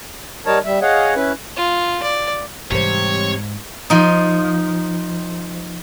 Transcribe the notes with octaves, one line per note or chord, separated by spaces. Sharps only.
G3 D#4 A#4 C#5 A5
G3 E5
G#4 C#5 D#5 F5 F#5
C#4 E4 B4
F4
D5
G#2 C3 E3 G3 C4 C#5
F3 D#4